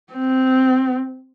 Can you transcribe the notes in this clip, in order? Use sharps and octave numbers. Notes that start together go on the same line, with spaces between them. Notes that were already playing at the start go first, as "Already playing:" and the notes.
C4